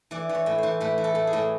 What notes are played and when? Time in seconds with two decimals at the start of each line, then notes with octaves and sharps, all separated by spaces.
0.11 E3 D5
0.29 E3
0.35 C#5
0.46 A2
0.58 E3 C5
0.80 A2 B4
0.98 E3
1.04 A4
1.15 A2
1.27 G#4
1.33 A2